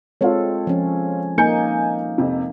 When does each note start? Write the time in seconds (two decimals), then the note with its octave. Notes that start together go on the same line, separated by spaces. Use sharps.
0.21 G#3 C4 F4 A4 C#5
0.67 F3 C#4
1.38 A#3 D#4 G#5 G6 C#7
2.18 F2 C3